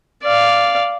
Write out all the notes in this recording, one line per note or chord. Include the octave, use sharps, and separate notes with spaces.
D5 F5